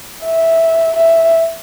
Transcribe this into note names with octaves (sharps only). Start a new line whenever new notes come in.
E5
E5